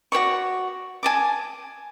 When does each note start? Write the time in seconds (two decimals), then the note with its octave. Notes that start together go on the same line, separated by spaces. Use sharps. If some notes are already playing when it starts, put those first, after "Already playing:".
0.12 F#4 C#5 D5 C#6
1.03 G#5 A5 D6